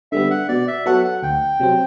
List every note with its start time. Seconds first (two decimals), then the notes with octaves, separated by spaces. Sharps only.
0.12 D3 G3 B3 E5
0.31 F#5
0.49 B2 D5
0.68 E5
0.86 F#3 B3 F#4 A4 F#5
1.04 F#5
1.23 D2 G5
1.60 C3 F#3 C4